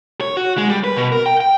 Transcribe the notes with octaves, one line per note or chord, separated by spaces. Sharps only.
C#5
F#4
G#3
G3
B4
B2
A#4
G5
G5